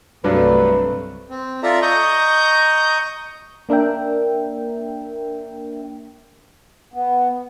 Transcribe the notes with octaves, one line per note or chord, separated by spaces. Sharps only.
C2 G2 F#3 A3 D4 B4
C4
F4 A4 D5 E5 A#5
D#5 A#5 C#6 D#6 G6
A#3 D4 A#4 E5 G5
B3